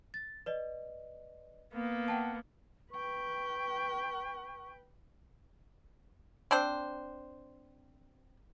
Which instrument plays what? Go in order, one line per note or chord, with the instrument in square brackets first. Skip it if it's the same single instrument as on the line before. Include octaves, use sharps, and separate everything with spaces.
[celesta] A6
B4 D5 D#5
[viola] A#3 B3
[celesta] F#5 G5 A5
[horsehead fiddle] B4 G5 [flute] C#6
[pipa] C4 D4 C5